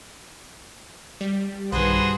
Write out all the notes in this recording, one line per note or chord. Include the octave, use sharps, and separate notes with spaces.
G3
B1 G2 D#3 F#4 G#4 B4 C5